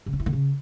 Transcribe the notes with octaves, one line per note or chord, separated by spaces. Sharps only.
C#3
C#4
E4
D3
C#3